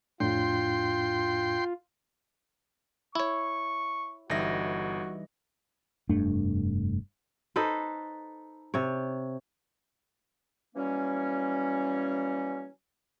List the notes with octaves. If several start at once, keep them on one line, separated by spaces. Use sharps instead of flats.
F2 A2 D4 F4 G5 C6
E4 C#5 C#6
G1 E3 G3 D#4 F#4 A#6
F1 G2 A3 D4
D#4 A4 B4 C5
C3 C#5
E3 F#3 G3 A#3 C#4